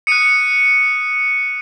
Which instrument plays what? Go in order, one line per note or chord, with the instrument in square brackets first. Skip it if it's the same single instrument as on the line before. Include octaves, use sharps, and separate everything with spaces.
[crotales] D#6 F#6 C#7 D#7